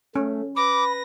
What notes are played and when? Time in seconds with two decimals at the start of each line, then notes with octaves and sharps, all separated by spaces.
0.15 A3 C#4
0.56 B4 B5 D6 A#6